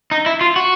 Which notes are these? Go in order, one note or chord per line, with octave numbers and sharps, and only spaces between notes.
D#4
E4
F4
F#4